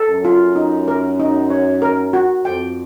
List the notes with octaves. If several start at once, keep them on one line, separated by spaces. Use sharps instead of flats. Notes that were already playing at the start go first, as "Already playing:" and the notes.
Already playing: A4
F#2
F4
D#4
A#4
D#4
C#5
A#4
F#4
F2 G5